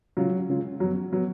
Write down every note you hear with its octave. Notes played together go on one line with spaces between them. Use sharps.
C#3 F#3 G#3 C#4 F4
C#3 G#3 C#4 F4
F#2 F3 F#3 B3
F3 F#3 B3